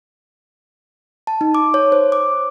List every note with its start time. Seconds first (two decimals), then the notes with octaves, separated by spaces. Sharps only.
1.27 A5
1.41 D#4
1.55 D6
1.74 C#5
1.92 C5
2.12 D6